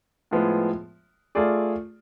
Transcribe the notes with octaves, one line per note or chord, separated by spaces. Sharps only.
A2 F3 G#3 B3
A3 F4 G#4 D5